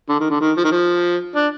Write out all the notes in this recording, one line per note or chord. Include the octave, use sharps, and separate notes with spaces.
D3
D#3
D3
D#3
F3
D#3
F3
D4